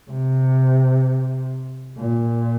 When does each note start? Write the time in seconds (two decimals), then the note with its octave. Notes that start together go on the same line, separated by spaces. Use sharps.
0.11 C3
1.98 A#2